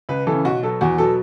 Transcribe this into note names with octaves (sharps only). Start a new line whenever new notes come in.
C#2 B4
E3 A4
C#3
B1 F#4
B2 F#3 A4
E2 F#4
B2 F#3 A4